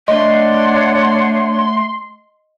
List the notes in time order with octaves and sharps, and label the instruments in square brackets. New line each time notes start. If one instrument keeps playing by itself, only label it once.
[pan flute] A3 [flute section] D4 C#5 F#5 [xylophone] D#5 [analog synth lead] C6